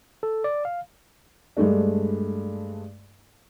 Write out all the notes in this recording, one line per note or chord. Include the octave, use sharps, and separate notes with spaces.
A4
D5
F5
G2 G#3 A3 D4